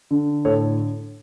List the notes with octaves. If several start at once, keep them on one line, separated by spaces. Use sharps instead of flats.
D3
A2 A4 C#5